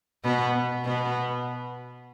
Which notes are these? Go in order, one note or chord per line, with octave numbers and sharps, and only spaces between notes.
B2 B3
B2 B3